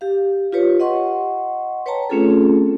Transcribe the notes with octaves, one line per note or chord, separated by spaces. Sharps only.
G4 F5
F4 G4 B4 C#5
D#5 F#5 C6 C#6
B4 C#5 G5 A5 A#5
A3 C4 C#4 F4 G#4 A4